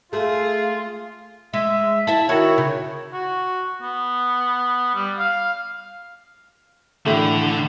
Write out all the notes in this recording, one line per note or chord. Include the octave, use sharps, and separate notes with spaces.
A3 F4 G#4 F5
G#3 E5
E4 E5 A5
D#3 E4 F#4 C#5
C#3
F#4
B3
G3
F5
A2 D3 E3 A3